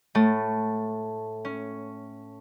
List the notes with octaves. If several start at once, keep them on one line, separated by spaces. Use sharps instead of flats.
A2 A3
C#4